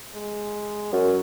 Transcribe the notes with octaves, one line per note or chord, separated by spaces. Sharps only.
G#3
F#2 F#3